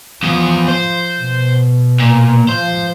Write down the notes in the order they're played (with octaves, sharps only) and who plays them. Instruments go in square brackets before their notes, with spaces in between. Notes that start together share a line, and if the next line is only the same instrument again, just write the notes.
[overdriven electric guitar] E2 B3 [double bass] F3
[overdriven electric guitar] C5
[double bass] B2
[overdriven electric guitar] A#2
[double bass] F3 [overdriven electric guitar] C5